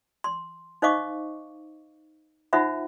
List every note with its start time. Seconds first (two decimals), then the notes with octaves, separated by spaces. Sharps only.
0.24 C6
0.82 D#4 C5 D#5 F5 C#6 D6
2.53 D#4 F4 C5 E5 F#5 B5